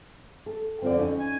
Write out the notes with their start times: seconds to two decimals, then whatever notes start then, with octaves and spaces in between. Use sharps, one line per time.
0.46 A4
0.82 F2 D3 C4 F4 D5
0.97 C#4 D#4
1.19 G#5